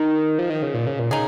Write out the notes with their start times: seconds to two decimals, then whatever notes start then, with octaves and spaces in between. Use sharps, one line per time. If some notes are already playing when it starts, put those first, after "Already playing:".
Already playing: D#3 D#4
0.39 F3
0.50 D#3
0.62 C#3
0.74 A#2
0.87 C#3
0.99 A#2
1.11 C#3 D#4 G#4